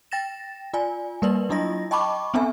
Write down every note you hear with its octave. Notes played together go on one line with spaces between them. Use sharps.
G5 A6 A#6 E7
F4 D5 G#5
G3 A#3 A#4 B4 D5 F#7
F#3 D4 E4 F4 D#5 A#6
D#5 G5 A5 B5 C#6 D6
B3 C4 D4 A4 E5 G#5